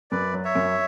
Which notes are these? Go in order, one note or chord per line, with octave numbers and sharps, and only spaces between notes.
F#2 B4 D5
F#3
C#5 E5
F#2